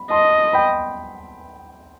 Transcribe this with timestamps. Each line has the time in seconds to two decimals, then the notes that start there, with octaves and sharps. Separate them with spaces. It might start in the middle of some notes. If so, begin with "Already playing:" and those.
Already playing: B5
0.10 D#5 A5 C6
0.53 G5 B5